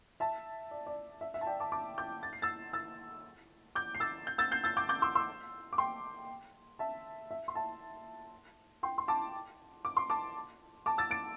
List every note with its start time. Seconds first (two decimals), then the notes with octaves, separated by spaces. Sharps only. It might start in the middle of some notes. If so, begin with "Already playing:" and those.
0.20 E5 A5
0.71 D5
0.87 D5
1.21 E5
1.34 E5
1.41 A5
1.47 D5 G5
1.60 A5 D6
1.72 A5 D6
1.98 D6 G6
2.23 A6
2.33 C7
2.42 E6 A6
2.73 E6 A6
3.75 D6 G6
3.95 C7
4.00 E6 A6
4.27 G6
4.38 E6 A6
4.51 G6 C7
4.64 E6 A6
4.77 D6 G6
4.89 D6 G6
5.02 C6 E6
5.15 C6 E6
5.73 D6
5.78 G5 C6
6.79 E5 A5
7.31 E5
7.48 C6
7.55 E5 A5
8.83 G5 C6
8.98 C6
9.08 A5 D6
9.85 D6
9.97 C6
10.10 A5 D6
10.86 A5 D6
10.98 E6 A6
11.11 A6 D7